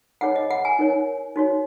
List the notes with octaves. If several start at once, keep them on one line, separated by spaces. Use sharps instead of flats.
D#4 G#4 C#5 F#5
D#5
F#5
G#5
D#4 A#4 C#5
D#4 F#4 C#5